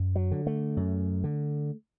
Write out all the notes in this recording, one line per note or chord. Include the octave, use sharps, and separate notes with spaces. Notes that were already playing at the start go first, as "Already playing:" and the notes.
Already playing: F#2
F#3
D3
A3
F#2
D3